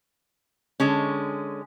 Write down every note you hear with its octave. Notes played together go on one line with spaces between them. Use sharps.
D3 G#3 C#4